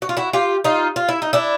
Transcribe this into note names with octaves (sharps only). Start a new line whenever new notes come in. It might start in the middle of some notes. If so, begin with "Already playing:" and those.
F#4
F4
E4 F#4
F4 G4
D#4 F4
F4
E4
D#4
D4 E4